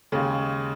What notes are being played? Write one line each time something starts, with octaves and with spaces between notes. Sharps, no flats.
D#2 C#3 G#3